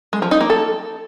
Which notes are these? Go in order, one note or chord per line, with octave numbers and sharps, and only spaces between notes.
G#3
F3
D#4
A#3
A4